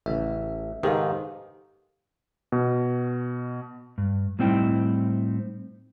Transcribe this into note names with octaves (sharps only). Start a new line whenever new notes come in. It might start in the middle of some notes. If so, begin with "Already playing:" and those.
A1 C#3 E5
G#2 D#3 G4 A4 B4 C5 F5
B2
G2
A2 G3 C4 D#4 E4 G5